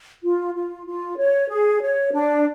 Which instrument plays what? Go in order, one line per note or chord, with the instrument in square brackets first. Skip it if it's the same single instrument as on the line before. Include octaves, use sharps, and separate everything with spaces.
[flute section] F4
F4
F4
C#5
G#4
C#5
D4